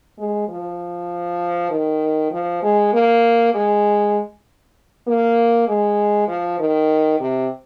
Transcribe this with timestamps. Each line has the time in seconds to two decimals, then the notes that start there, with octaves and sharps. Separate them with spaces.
0.18 G#3
0.49 F3
1.70 D#3
2.31 F3
2.62 G#3
2.93 A#3
3.54 G#3
5.07 A#3
5.68 G#3
6.28 F3
6.59 D#3
7.20 C3